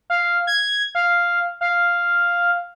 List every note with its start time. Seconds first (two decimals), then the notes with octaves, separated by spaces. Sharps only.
0.10 F5
0.47 G#6
0.95 F5
1.61 F5